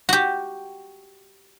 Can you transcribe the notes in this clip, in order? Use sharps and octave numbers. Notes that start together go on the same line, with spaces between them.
F#4 G4